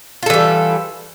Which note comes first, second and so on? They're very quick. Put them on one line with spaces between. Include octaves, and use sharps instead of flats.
F4 A4 E3 G3